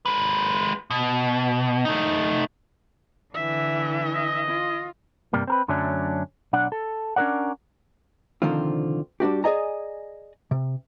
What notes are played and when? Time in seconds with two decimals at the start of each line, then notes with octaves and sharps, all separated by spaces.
0.06 G#3 B4
0.90 B2
1.85 A3 D#4
3.34 D3 E3 E5
4.14 D#5
4.47 F4
5.33 G2 C3 G3 A#3
5.47 C4 A#4 B4
5.68 F#2 D3 F#3 A3 C#4 D4
6.53 B1 D4 F#5
6.72 A4
7.16 C#4 D4 G#4 A#4 D5 F#5
8.42 C2 D3 D#3 F3 C4 F4
9.20 G3 D4 F#4 G4
9.44 G#4 B4 D5 D#5 G#5 A#5
10.51 C3